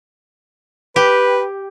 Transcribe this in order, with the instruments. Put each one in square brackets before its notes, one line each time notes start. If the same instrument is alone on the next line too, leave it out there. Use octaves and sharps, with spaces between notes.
[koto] G4 [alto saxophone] B4